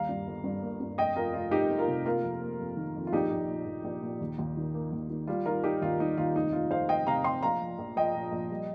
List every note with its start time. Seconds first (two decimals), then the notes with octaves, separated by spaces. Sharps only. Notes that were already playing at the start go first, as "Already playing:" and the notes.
Already playing: D#2 G3 F5 A#5
0.09 G2
0.27 G1
0.44 G2
0.62 A#3
0.80 G2
0.98 F1 D#5 G5
1.16 F1 F4 A#4
1.34 F1 F4
1.51 F1 D#4 G4
1.70 F1
1.78 F4 A#4
1.88 C3
2.06 A#3 F4 A#4
2.23 F2
2.42 A#3
2.59 F2
2.77 D#3
2.96 F2
3.07 F4
3.12 A#1 D#4 G4
3.31 A#1
3.49 A#2
3.66 A#1
3.84 A#1
4.02 A#2
4.20 D#2
4.38 D#2
4.57 D#3
4.74 A#3
4.92 D#2
5.10 D#3
5.27 G3 F4
5.46 D#3 F4 A#4
5.64 G3 D#4 G4
5.81 D#2 F4
6.00 G3 D#4
6.18 D#2 F4
6.36 F1 D#4
6.53 F1 F4
6.71 F1 C5 F5
6.89 F1 D#5 G5
7.07 C3 F5 A#5
7.24 C3 G5 C6
7.43 A#1 F5 A#5
7.61 F3
7.78 A#1
7.96 F3 D#5 G5
8.15 A#2
8.32 A#1
8.51 G3